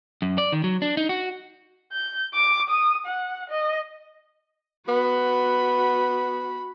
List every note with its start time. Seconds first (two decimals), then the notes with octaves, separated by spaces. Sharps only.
0.22 F#2
0.38 D5
0.52 D#3
0.64 F#3
0.82 D4
0.97 D#4
1.09 F#4
1.92 G6
2.34 D6
2.70 D#6
3.06 F#5
3.50 D#5
4.88 B3 F#4 B5